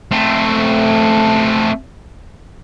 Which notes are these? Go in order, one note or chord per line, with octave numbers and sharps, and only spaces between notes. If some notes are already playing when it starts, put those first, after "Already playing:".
A3 C4